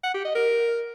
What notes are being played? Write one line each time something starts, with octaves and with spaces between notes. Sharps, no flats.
F#5
G4
D#5
A#4